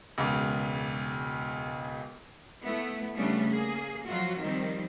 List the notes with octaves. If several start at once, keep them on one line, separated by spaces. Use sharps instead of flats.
E1 C#2
A3 B3 E4
C#3 G3 A3 B3 C#4 D4
A#3 G#4
F2 F#3 F4 F#4
D#3 F3 G3 C4